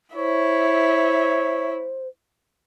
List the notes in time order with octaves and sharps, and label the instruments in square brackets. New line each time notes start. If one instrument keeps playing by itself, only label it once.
[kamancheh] E4 E5 [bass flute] C5 [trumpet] C#5